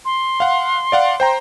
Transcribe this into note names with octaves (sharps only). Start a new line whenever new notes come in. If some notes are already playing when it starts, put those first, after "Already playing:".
C6
F5 F#5
D5 F5 F#5
C5 G5 A#5